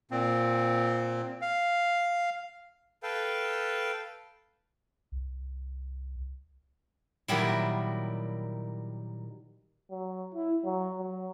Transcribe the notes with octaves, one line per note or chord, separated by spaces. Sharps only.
A#2 C4
F5
A4 B4 F5 G5
C2
A#2 D#3 F#3 G3 E4
F#3
E4
F#3
F#3